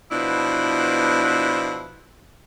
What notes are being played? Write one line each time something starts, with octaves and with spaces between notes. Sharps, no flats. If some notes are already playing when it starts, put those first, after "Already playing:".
B2 F3 B3 D4 E4